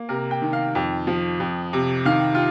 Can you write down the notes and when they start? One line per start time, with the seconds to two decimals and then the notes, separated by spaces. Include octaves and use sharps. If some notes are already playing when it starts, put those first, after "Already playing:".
Already playing: A#3
0.09 C3 A#4
0.31 G5
0.42 D#3
0.53 F5
0.75 F2 G5
1.07 F3
1.40 F2
1.73 C3
2.05 D#3 F5
2.35 F4